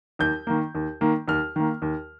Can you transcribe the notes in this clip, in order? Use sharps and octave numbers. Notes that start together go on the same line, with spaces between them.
D#2 G6
D#3 A#3
D#2
D#3 A#3
D#2 F6
D#3 A#3
D#2